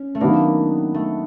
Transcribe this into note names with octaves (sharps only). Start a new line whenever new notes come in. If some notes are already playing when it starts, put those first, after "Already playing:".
Already playing: C#4
A3
D#3 F#3 A#3 B3 D4
A3